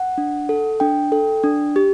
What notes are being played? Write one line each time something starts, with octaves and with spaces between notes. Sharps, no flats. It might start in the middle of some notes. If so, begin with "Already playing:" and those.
Already playing: F#5
D4
A4
D4 G5
A4
D4
G4